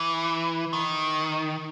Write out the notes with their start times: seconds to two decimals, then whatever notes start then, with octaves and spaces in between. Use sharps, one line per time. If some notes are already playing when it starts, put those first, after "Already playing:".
Already playing: E3
0.73 D#3